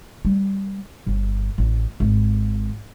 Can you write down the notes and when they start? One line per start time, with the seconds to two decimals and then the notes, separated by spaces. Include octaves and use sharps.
0.25 G3
1.07 G1
1.58 A1
2.00 G#1